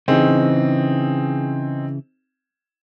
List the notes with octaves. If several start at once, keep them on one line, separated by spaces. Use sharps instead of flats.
C#3 E3 C4 D#4 G#4